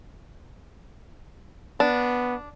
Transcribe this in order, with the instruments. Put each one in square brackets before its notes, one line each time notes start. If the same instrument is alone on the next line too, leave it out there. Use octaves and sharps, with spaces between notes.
[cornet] B3 [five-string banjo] D4